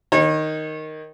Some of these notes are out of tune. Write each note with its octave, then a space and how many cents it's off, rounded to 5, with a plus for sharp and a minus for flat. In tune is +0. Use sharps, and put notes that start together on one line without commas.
D#3 +0 D#4 +0 C#5 -35